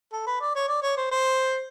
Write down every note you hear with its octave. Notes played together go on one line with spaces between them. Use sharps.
A4
B4
D5
C#5
D5
C#5
C5
C5